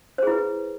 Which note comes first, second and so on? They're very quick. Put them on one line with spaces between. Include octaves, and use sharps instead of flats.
C5 G#4 E4 B4